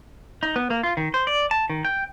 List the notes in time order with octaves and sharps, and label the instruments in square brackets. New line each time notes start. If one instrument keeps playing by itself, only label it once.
[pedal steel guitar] D#4
B3
A#3
F4
D#3
C5
D5
A5
D#3
G5